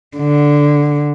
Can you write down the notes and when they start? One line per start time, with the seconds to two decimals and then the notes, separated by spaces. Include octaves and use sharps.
0.17 D3